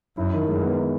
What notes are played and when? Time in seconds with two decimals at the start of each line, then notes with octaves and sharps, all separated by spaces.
0.17 F#2 E4
0.33 D#3
0.48 F#2 G#3
0.63 B3
0.77 E4